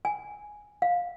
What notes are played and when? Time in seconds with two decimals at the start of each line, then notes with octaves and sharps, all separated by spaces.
0.05 G#5
0.82 F5